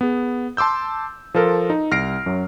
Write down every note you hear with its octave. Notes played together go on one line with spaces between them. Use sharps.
B3 G#4
A5 C6 D6 E6 G6
F3 F4 A4 A#4
D#4
C2 F6 A#6 C7 D7
F#2 F#3